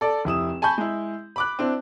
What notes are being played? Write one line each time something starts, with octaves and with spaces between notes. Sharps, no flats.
A4 D5
F1 E4 D#6 E7
G#5 A5 B5 C#6 G6
G#3 E4
B5 D6 F#6
C4 D4 E4